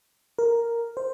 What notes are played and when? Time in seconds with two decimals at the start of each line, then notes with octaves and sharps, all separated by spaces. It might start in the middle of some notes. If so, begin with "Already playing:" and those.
0.39 A#4
0.97 C5